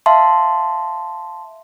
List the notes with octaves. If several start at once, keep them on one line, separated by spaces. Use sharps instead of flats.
E5 F5 A5 C6